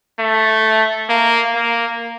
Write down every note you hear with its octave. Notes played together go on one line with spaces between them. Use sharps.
A3
A#3
A#3